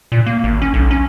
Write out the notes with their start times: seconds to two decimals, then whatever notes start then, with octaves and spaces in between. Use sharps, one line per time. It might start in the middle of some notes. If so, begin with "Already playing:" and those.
0.12 A#2
0.26 A#3
0.44 G#1
0.62 C#4
0.74 B1
0.91 C#4